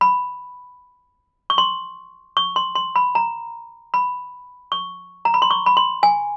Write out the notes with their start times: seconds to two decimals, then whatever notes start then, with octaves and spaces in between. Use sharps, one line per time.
0.01 B5
1.50 C#6
1.58 C6
2.37 C#6
2.56 C6
2.75 C6
2.96 B5
3.15 A#5
3.94 B5
4.72 C#6
5.25 A#5
5.34 B5
5.42 C6
5.51 C#6
5.66 B5
5.77 C6
6.03 G#5